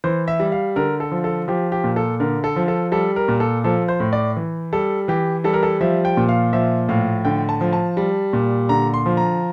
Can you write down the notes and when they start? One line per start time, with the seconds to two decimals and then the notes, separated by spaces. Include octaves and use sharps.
0.04 E3 C5
0.28 E5
0.40 G3
0.52 F5
0.76 D3 A#4
1.00 A4
1.12 F3
1.24 A4
1.48 F3 G4
1.72 G4
1.84 A#2
1.96 A4
2.20 D3 A#4
2.44 A4
2.56 F3
2.68 A4
2.92 G3 A4
3.16 A#4
3.28 A#2
3.40 A4
3.64 F3 A4
3.88 C5
4.00 A2
4.13 D5
4.36 E3
4.73 G3 A4
5.08 E3 G4
5.44 G3 A4
5.54 A#4
5.63 A4
5.81 F3 E5
6.05 G5
6.17 A#2
6.29 F5
6.53 F3 E5
6.89 A2 F5
7.25 D3 G5
7.49 A5
7.61 F3
7.73 A5
7.97 G3
8.33 A#2
8.69 D3 A#5
8.94 C6
9.06 F3
9.17 A#5